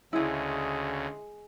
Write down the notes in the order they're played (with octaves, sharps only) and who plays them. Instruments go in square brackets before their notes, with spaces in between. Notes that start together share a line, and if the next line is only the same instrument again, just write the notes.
[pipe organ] D2 C#3 [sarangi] G#3 [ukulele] E4 G#4